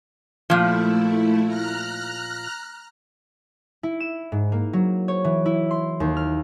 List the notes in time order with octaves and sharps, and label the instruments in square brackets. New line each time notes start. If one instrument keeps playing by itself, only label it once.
[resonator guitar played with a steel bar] A#2 F3 [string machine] A3 E4
[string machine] A#5 F6 F#6
[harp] E4
E7
G#2
A#3
F#3
C#5
E3
E4
C6
D#2
F6